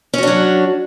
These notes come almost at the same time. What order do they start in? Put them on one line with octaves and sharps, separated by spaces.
C#4 F#4 D4 F#3